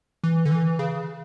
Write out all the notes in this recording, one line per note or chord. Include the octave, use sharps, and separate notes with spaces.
E3
D3
E3
C#3